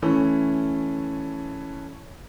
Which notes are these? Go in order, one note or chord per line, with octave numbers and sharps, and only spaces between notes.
E3 A3 C#4